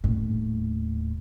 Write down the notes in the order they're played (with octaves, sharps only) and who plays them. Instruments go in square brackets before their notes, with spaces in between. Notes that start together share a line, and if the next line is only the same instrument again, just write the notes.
[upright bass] D#1 A2